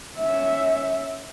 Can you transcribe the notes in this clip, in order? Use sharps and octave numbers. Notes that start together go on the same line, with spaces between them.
C#4 E5